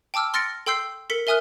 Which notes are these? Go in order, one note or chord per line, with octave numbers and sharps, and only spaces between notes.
G5 A5 D6 E6 F6
C6 F6 A6 A#6 C#7 D7
A4 G5 C6 E6 G6 C7
A4 A#4 B6 C#7
A#4 E5 G#5 D#6 F6 F#6